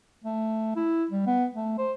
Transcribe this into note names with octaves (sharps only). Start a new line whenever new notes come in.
A3
E4
G3
B3
A3
C5